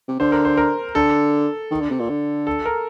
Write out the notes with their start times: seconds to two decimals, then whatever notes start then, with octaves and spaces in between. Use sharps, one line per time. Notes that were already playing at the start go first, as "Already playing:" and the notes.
0.08 C3
0.20 D3 C5
0.32 A#4
0.45 C5
0.57 A#4
0.95 D3 A4
1.71 D#3
1.80 D3
1.90 C3
1.99 A#2
2.09 D3
2.47 A4
2.66 A#4